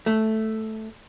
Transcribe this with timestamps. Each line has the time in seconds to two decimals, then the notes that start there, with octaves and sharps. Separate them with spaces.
0.06 A3